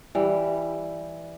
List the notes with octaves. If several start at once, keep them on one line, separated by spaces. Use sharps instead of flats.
E3 G3